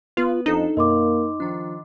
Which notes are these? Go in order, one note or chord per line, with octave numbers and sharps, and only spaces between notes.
B3 F4 B4
F2 D4 D#4 A4
F#2 B2 A#3 D#5 C6 D6
D#3 F3 D4